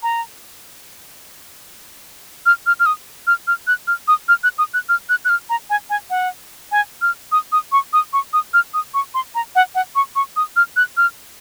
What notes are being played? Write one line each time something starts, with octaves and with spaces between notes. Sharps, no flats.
A#5
F6
F6
F6
D#6
F6
F6
F#6
F6
D#6
F6
F#6
D#6
F#6
F6
F#6
F#6
F6
A#5
G#5
G#5
F#5
G#5
F6
D#6
D#6
C#6
D#6
C#6
D#6
F6
D#6
C#6
C6
A#5
F#5
F#5
C#6
C#6
D#6
F6
F#6
F6